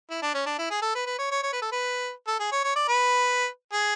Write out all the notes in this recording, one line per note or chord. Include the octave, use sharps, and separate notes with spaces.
E4
D4
C#4
D4
E4
G#4
A4
B4
B4
C#5
C#5
C#5
B4
A4
B4
A4
G#4
C#5
C#5
D5
B4
G#4